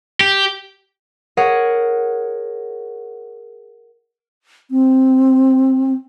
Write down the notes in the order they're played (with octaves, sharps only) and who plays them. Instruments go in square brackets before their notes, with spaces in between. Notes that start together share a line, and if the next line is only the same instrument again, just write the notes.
[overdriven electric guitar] G4
[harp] G#4 A#4 C#5 F#5
[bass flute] C4